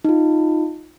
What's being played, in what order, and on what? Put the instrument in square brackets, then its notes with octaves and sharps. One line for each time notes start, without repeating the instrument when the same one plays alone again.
[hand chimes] D#4 F4